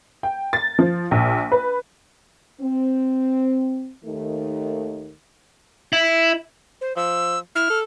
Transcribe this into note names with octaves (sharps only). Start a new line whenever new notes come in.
G5
A6
F3
A#1
B4
C4
D#2 D#3 A3
E4
C5
F3 E6
E4 F6
A4